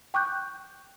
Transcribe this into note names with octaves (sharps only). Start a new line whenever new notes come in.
G5 C#6 D6 F#6 G6